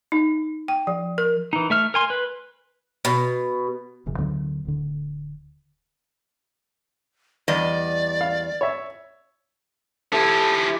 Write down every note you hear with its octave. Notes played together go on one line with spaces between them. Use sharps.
D#4
G5
F3
A#4
E3 D#4
A3 E5 F6
A#4 G#5 C6
B4
B2
E1 F#2 C#3
D2 D3 F#3 B3
D1 D3
E2 G3 D5 D#5
F5
C#5 E5
F3 E4 G4 A4 E5